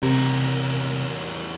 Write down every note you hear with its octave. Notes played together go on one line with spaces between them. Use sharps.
E2 C3 A#4